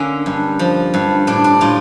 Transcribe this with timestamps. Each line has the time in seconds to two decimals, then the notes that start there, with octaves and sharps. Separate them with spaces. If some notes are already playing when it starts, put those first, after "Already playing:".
Already playing: D3 A#3 C#4
0.26 G2
0.59 F3
0.94 G2
1.27 A2 D4
1.44 D4
1.61 A2 F4